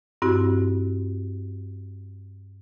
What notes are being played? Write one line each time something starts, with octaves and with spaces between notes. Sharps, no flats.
G2 C4 E4 F#4